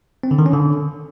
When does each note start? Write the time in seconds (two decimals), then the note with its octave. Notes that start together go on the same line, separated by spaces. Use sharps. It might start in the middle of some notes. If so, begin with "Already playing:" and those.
0.23 C4
0.31 D3
0.39 D#3
0.46 C#4
0.54 D3